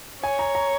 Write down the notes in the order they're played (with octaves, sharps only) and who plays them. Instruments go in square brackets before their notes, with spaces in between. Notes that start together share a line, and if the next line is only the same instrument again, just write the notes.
[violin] C#5 [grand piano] G#5
[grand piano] A#5
A#5